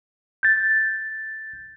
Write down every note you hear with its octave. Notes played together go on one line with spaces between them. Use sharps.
G6 A6